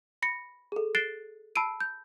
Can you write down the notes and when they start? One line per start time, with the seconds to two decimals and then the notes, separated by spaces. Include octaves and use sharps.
0.22 B5 A#6 C#7
0.72 G#4 A4
0.95 F#6 A6 C7 D7 E7 G7
1.55 A5 B5 E6 C7 D7 D#7
1.80 G6